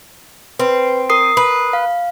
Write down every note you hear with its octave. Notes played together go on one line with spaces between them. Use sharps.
C4 B4
A#4 D#6 C7
B4
F5